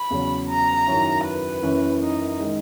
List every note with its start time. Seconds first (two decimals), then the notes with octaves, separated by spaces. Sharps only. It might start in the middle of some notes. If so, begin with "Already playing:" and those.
Already playing: B5
0.10 E2 C#3 F#3 C#4
0.49 A#5
0.87 F#2 D#3 F#3 C#4 E4
1.25 B4
1.63 F#2 E3 A#3 C#4 E4
2.01 D#4
2.39 D#3 G#3 D#4